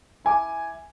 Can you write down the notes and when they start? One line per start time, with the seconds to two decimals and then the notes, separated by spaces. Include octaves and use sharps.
0.25 E4 G#5 D6